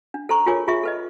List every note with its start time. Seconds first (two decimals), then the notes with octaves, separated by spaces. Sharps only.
0.14 D4
0.29 A4 C5 A#5 C#6
0.46 F4 G#4 A#4 C#5 G#5 D6
0.68 F4 G#4 E5 C#6
0.83 A4 B4 D#5